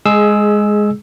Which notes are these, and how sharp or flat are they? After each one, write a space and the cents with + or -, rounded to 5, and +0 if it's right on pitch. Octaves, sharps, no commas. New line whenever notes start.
G#3 +0 G#4 +15 E6 +0